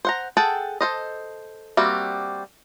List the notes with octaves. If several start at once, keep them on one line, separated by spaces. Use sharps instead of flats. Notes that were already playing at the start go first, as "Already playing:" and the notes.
C5 F#5 A#5
G#4 A4 F#5 G5 A5
A4 C5 D#5
G3 A#3 C4 F#4 E5